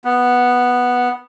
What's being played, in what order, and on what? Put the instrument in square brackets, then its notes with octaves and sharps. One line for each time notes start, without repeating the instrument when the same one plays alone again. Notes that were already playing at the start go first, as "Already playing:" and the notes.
[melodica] B3